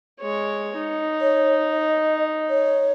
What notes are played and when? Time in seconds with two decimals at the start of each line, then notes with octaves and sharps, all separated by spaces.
0.21 G#3 C#5
0.77 D#4
1.21 C#5
1.71 D#5
2.50 C#5